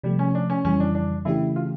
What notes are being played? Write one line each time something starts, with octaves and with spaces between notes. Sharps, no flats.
C3 F3 G3 A3
C#4
D4
C#4
F2 C#3 E3 G3 C#4
D4
D4
C#3 E3 A3 D4 E4 G4
F4